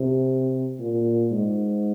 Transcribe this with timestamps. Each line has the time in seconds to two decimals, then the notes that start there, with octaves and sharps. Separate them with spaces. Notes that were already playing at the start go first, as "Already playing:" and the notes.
Already playing: C3
0.80 A#2
1.32 G#2